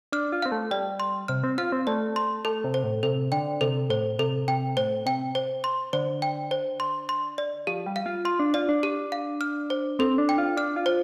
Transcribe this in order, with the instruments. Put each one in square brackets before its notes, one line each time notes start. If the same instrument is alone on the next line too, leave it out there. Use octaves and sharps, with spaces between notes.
[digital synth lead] D4 [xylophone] F6
[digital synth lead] F4
[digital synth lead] C4 [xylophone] F5
[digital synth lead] A3
[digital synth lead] G3 [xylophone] D5
[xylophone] C6
[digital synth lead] C3 [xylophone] F6
[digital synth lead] C4
[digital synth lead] F4 [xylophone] F5
[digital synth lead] C4
[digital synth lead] A3 [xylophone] D5
[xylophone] C6
[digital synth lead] A3 [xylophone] A4
[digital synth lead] C3
[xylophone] C5
[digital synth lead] A2
[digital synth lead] C3 [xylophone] A4
[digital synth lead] D3 [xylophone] G5
[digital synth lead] C3 [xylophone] A4
[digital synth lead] A2 [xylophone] C5
[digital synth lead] C3 [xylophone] A4
[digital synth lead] C3 [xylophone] G5
[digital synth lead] A2 [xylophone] C5
[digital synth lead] C3 [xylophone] G5
[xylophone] C5
C6
[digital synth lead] D3 [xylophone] C5
[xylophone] G5
C5
C6
C6
D5
[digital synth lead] F3 [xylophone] G4
[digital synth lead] G3
[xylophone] F5
[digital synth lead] F4
[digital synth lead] F4 [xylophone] C6
[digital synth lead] D4
[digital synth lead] F4 [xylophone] D5
[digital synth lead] D4
[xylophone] G4
F5
F6
C5
[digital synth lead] C4 [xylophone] A4
[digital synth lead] D4
[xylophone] G5
[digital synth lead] F4
[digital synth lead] D4 [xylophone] F6
[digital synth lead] F4
[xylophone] C5